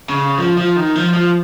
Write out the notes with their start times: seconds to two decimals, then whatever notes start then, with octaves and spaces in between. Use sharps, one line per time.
0.09 C#3
0.38 F3
0.58 F3
0.76 D#3
0.96 F3
1.14 F3